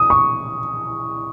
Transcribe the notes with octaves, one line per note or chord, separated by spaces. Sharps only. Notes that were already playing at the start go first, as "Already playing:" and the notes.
Already playing: D#6
C#6